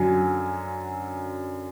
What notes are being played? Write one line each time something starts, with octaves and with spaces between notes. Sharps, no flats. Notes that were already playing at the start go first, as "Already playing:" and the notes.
Already playing: F#2 D3 F#3 G#5